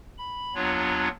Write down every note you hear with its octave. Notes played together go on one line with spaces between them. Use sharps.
B5
D#2 F#3 B3 D4 F4 C#5